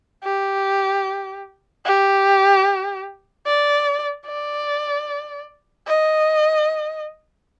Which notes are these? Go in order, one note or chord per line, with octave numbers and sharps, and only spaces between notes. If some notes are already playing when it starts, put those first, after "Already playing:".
G4
G4
D5
D5
D#5